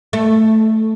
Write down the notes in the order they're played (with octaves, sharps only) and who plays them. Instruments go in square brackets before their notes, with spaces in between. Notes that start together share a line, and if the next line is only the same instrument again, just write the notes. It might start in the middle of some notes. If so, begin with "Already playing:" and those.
[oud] A3